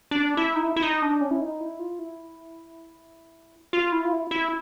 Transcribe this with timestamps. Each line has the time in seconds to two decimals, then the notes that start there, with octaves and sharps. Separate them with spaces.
0.11 D4
0.37 E4
0.56 D#4
0.63 E4
0.76 E4
0.82 D#4
1.02 D4
1.21 C#4
1.31 E4
1.41 D#4
1.61 E4
1.79 F4
1.99 E4
3.73 F4
3.92 E4
4.05 F4
4.12 E4
4.31 E4